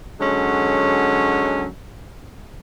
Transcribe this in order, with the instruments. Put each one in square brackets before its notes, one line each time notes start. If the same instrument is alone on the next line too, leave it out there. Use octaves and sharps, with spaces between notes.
[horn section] D3 F#3 G#3 C#4